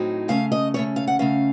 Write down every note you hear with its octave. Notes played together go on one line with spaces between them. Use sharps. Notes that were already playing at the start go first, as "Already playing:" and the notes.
Already playing: A2 F#3 C4 D#4
C#3 A3 C#4 F5
D#5
C#3 A3 C#4 C#5
F5
F#5
C#3 A3 C#4 F5